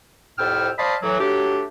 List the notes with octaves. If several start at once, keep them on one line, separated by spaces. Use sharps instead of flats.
C2 F2 A2 G5 E6 F6
C5 D5 D#5 F5 A5 B5
A2 E3 F#3
F#3 A3 D4 G4